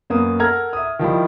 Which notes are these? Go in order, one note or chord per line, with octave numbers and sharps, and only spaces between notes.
F#2 A#3 B3 D#6
A4 A#4 F#5 A#5 F6 G#6
E5 D#6
D#3 F3 G3 E4